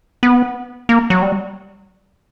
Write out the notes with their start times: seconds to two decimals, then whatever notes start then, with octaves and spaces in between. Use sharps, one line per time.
0.23 B3
0.89 A#3
1.10 F#3
1.22 G3